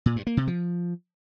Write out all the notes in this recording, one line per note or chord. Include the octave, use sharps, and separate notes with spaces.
A#2
G2
A#3
C3
F3